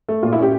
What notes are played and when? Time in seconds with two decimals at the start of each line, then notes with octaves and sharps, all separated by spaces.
0.08 A3
0.23 A#2 F4
0.33 E4
0.38 C#4 G4